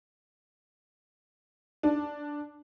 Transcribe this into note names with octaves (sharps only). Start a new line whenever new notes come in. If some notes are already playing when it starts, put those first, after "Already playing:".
D4